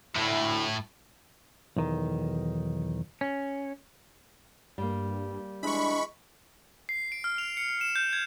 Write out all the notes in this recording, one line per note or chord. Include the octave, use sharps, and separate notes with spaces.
D2 A2 E4
B1 E2 D#3
C#4
G2 G3 A#3
E3 G#3 D4 B5 C#6
C7
D7
F6
F7
C#7
E7
G6
G#6